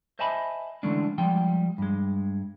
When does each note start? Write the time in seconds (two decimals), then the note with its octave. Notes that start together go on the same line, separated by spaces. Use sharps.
0.19 C5 D#5 E5 G#5 A5 B5
0.83 D3 E3 G#3 A3 C#4 D4
1.18 F3 G3 G#3 G5
1.78 G2 G#3